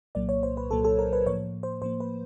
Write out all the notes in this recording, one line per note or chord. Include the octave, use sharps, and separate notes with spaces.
C2 A#2 F#3 A#3 D5
C#5
C5
B4
C2 A#2 F#3 A#3 A4
A4
A#4
B4
A2 F3 A#3 C#5
C5
A2 F3 A#3 C5
B4